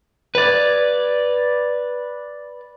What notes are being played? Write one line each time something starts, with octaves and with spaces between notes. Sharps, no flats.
B4 D5